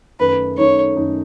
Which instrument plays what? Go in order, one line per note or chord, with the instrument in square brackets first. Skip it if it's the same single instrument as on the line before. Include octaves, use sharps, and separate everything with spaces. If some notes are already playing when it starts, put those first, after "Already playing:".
[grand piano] F#2 D#3 A3 D#4 [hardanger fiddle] B4
[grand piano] F#2 D#3 A3 D#4 [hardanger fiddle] C#5
[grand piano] F#2 D#3 A3 D#4